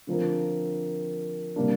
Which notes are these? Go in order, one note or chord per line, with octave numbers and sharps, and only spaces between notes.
D3 F3 C4 F4 A#4
C3 G3 A#3 D4